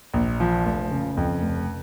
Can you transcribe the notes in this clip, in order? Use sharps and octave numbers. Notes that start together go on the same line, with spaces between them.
A#1
F3
F1
C#3
F2
F1